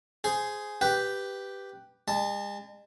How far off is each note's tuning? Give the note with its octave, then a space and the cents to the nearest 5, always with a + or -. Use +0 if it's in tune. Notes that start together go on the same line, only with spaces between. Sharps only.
G#4 +5 C5 -10
G4 +0 B4 +0 G5 +0
G#3 -45 A5 +0